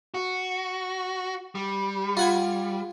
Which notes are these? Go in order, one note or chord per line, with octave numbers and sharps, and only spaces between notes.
F#4
G3
F4 F#5 G#5